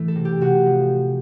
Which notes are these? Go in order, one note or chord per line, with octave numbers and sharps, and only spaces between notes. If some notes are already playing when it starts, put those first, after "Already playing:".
Already playing: A2 E3 A3
A4
C3
G4
C3 F#4
F3